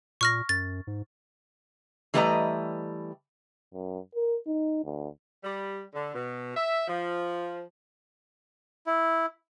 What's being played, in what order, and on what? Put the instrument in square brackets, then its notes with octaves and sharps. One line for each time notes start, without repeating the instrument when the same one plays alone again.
[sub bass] A#2 [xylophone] C#6 F6 A#6
[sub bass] F#2 [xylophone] A6
[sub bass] G#2
[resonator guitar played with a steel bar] E3 G3 A3 B4 D#5 A#5
[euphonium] F#2
A#4
D#4
D2
[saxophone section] G3
D3
B2
E5
F3
[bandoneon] E4